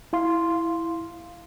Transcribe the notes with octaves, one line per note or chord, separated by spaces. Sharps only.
E4 F5 C6